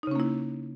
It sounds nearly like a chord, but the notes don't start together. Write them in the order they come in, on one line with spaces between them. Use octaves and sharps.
D#4 C#3 C#4 A#3 E4